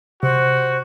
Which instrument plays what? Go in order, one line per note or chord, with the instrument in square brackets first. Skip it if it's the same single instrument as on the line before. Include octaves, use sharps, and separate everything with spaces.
[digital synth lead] C3 [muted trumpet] F#4 [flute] C5